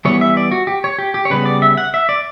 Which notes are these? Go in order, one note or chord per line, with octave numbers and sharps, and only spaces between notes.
E3 G3 B3 C#5
E5
D5
F#4
G4
C#5
G4
G4
C#5
C#3 G3 B3 B4
D5
E5
F#5
E5
D5